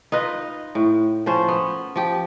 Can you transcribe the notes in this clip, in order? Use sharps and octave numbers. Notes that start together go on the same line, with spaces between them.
D#4 F4 B4 D#5
A2
F3 C#4 C5
B3
F3 G4